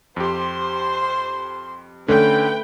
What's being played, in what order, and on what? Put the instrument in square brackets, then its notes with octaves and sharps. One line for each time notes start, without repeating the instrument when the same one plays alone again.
[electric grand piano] F2 G4 [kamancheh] C5 C6
[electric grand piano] D3 C#4 [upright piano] A3 [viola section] B4 G5